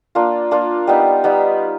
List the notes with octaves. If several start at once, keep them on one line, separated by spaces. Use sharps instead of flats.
A#3 D4 F4
A#3 D4 F4
G3 B3 D#4
G3 B3 D#4